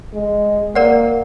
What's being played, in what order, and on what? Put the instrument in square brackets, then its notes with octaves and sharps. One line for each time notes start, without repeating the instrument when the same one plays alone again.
[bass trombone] G#3
[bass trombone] A#3 [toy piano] A#4 D5 F#5